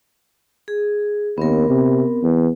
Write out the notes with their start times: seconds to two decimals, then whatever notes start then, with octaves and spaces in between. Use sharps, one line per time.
0.68 G#4
1.38 D#2 B3 C4 A#4
1.69 C3
2.23 E2